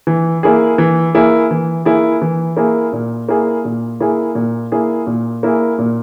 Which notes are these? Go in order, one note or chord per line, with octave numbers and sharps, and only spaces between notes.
E3
A#3 E4 G#4
E3
A#3 E4 G#4
E3
A#3 E4 G#4
E3
A#3 E4 G#4
A#2
A#3 E4 G#4
A#2
A#3 E4 G#4
A#2
A#3 E4 G#4
A#2
A#3 E4 G#4
A#2